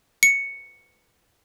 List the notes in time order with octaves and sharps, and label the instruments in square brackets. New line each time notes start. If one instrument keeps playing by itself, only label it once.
[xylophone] C#7